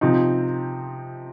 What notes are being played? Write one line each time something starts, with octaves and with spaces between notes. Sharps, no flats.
C3 F3 C4 D#4